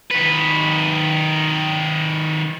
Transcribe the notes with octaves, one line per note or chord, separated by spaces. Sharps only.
D#3 B4